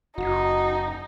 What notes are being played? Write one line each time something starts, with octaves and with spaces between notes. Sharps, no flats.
F#1 D#4 F#4